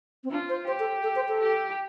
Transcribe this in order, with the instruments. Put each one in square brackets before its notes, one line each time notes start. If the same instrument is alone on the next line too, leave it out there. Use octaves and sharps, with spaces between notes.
[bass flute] C4
[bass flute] D4 [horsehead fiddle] F4
[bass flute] C5
[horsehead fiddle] G4 [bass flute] C5
[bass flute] A4
A4
C5
A4
[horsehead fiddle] G4